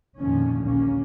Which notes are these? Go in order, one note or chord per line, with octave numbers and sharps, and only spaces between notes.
F2 A#2 D3 D#3 F3 C#4
A#1 D#2 A#3 C#4